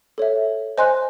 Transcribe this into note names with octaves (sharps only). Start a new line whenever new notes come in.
A4 C#5 E5
C5 D#5 G#5 C6 F#6